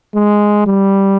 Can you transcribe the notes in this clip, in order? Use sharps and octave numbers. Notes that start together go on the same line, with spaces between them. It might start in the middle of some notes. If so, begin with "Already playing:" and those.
G#3
G3